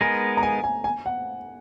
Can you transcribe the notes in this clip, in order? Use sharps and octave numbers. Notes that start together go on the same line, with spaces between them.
G#3 B3 D#4 A#4 G#5
A#5
G#5
G#5
G#5
F#5